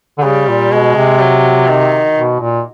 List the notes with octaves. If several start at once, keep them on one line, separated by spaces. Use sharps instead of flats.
D3
C#3 G3
A#2
B2 G#3
C3
F#3
D#3
B2
A#2